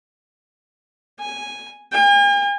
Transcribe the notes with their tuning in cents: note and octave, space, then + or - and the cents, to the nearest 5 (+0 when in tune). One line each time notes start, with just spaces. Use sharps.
G#5 -5
G#5 -45